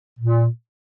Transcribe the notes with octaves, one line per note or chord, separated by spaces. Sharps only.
A#2